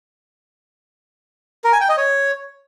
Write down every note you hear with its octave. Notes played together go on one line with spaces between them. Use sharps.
A#4
G#5
G5
D#5
C#5